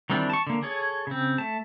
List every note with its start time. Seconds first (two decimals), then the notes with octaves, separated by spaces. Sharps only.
0.10 D#3 E3 G3 C4 D4
0.30 A5 C#6
0.47 D3 A#3
0.63 G#4 A4 C#5
1.07 C#3 C4
1.38 A3 A5